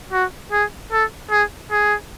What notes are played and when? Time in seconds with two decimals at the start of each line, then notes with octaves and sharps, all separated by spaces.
0.13 F#4
0.52 G#4
0.92 A4
1.31 G#4
1.72 G#4